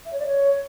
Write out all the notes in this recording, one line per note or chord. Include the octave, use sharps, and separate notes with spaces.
E5
C#5
D5
C#5